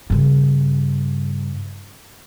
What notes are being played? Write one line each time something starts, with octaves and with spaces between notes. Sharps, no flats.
G2 C#3